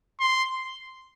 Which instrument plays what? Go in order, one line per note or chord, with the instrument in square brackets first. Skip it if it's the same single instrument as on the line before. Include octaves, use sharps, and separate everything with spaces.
[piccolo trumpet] C6